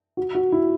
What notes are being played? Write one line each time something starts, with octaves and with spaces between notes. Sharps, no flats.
F#4
F#4
E4